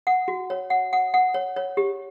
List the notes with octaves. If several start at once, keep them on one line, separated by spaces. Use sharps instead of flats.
F#5
F#4
C#5
F#5
F#5
F#5
C#5
C#5
G4